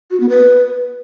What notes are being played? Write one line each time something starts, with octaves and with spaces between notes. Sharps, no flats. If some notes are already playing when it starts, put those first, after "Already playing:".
F#4
B3
B4